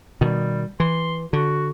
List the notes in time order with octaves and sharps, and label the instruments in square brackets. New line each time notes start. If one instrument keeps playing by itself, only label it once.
[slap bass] B2 D#3 [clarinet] G3
[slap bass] E3 [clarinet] C6
[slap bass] D3 [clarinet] F#4